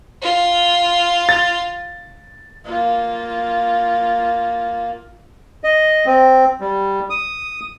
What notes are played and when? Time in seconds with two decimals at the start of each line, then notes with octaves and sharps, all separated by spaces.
0.23 F4
1.29 A6
2.65 A#3 F4
5.64 D#5
6.06 C4
6.60 G3
7.10 D#6